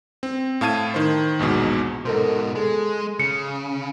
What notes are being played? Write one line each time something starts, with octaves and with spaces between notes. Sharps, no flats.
C4
A2 F5 A5 G#6 D#7
D#3 C5
A#1 E2 G#2 B2
G#2 B2 A4 A#4 C5
G#3 G#4 A4
C#3 C#7